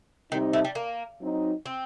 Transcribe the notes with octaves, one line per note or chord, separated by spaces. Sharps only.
C3 D#3 G3 C4 D#4
A3
G3
A#3
F#3 C4 D#4
C4